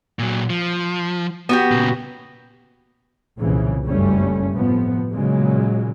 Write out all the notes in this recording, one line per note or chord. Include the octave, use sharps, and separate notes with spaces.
A#2 F#3
F3
B3 F#4 G4
A#2 C#3
F1 C2 A#2 C#3 E3
F#1 G2 G3 A3 C#4
A2 C3 F3 B3
A#2 C#3 F#3 G#3